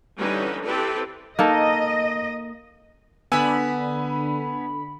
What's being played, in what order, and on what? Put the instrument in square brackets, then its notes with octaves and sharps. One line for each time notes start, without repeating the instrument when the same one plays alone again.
[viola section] D3 E3 G3 C#4 D#4 B4
C4 E4 G4 A4 B4
[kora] A#3 D#4 A4 [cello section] D#5
[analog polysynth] D3 B5 [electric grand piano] B3 G#5 E6